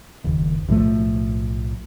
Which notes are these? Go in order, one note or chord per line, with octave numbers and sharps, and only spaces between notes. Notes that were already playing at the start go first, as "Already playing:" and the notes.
F#1 D#2
B1 A2 F3 A3